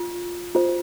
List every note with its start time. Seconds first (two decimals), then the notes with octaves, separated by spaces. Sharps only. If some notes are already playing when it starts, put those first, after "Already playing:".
Already playing: F4
0.55 F4 C5